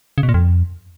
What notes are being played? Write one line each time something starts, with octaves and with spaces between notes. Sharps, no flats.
C#3
B2
A#2
F2